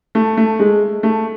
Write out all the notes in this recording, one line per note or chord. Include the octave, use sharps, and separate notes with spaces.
A3
A3
G#3
A3